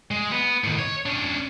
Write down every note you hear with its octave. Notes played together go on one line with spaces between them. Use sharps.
G#3
B3
A2 D#3
C#5
C#4 D4